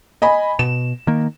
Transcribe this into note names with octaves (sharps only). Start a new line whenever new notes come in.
D#5 G#5 B5
B2 E7
D#3 A#3